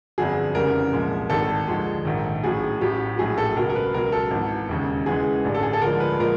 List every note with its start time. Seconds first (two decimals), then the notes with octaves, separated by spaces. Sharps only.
0.18 G1 F2 D3 F#3 G#4
0.54 F1 E2 C#3 E3 G3 A#4
0.93 C2 A#2 F3 G#3
1.30 G#1 G2 D#3 A4
1.68 D#2 D3 F3 G#3
2.05 A#1 G#2 D#3
2.44 A1 A2 F#3 G#4
2.81 A1 A2 F#3 G4
3.18 A#1 A2 F#3 G#4
3.38 A4
3.56 C#2 B2 F#3 A#4
3.69 A#4
3.75 B4
3.94 C#2 B2 F#3 A#4
4.12 A4
4.31 G#1 G#2 E3
4.69 E1 D#2 C#3
5.06 E2 C#3 E3 G#3 G#4
5.44 A1 G2 D3 G3
5.54 A4
5.63 G#4
5.73 A4
5.81 D2 D3 F3 G#3 A#4
6.00 B4
6.20 A#2 F3 G#3 A#4